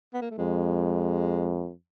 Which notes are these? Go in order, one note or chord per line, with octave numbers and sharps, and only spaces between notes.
B3
A#3
A3
F2 G#3